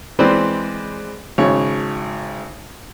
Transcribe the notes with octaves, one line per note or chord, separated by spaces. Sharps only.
E3 G#3 C4 B4 C5 D5
G#1 C#3 C#5